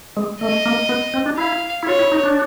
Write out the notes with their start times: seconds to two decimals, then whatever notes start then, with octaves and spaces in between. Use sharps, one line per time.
0.17 G#3
0.41 A3 D#5
0.66 A#3
0.89 B3
1.14 C4
1.26 D4
1.38 E4 F5
1.83 E4
1.87 F4 C#5
1.99 E4
2.12 D#4
2.24 D4